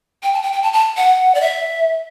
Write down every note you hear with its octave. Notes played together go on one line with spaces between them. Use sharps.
G5
A5
G5
G5
A5
A5
F#5
D5
E5